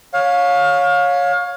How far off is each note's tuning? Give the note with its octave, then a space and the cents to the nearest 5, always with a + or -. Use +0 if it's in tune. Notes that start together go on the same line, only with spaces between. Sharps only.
C#5 +0 F5 +25